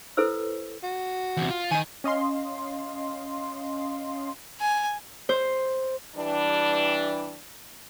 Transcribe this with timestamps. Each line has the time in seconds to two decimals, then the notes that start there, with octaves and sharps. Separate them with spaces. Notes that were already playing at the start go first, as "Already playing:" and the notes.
0.17 E4 A4 B4 C5 E6
0.83 F#4
1.37 E2 C3
1.50 F4
1.71 D#3 D#4 G#5
2.04 C#4 D#5 F5 C6
4.60 G#5
5.29 C5
6.16 E3 G3 D4